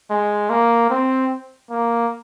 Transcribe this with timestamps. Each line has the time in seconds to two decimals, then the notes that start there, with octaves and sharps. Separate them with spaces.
0.10 G#3
0.50 A#3
0.90 C4
1.70 A#3